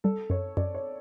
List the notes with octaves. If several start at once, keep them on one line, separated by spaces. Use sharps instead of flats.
G3 A4
F#2 C#5
F#2 D5
C#5